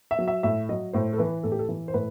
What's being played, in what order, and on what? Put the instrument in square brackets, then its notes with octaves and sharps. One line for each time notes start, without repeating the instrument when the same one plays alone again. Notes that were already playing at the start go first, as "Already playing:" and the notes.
[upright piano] E5
F#3
E5
A2 E5
F#3 D#5
A2 C5
A4
E3 B4
A2 A4
G4
A4
E3
C5
A2 B4